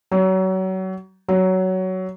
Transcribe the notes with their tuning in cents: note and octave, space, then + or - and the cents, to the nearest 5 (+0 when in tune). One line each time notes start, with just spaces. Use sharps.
F#3 +30
F#3 +15